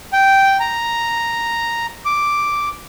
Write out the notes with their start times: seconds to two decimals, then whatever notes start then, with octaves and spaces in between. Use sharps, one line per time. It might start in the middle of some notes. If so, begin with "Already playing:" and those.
0.13 G5
0.60 A#5
2.05 D6